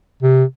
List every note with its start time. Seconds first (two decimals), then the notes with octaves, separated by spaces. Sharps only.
0.23 C3